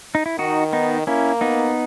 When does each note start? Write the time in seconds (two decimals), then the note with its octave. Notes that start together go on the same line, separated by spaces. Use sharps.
0.15 D#4
0.26 E4
0.38 D#3 D#4 F#4
0.73 B3 D#4
1.07 A#3 C#4 E4
1.41 B3 D#4